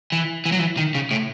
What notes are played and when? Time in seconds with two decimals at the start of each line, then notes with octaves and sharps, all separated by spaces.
0.12 E3
0.45 E3
0.52 F#3
0.59 E3
0.77 D#3
0.95 C#3
1.11 A2